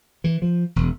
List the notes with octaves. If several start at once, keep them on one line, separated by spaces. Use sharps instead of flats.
E3
F3
E1